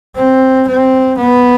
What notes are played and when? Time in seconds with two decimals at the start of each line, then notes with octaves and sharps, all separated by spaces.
0.16 C4
0.68 C4
1.18 B3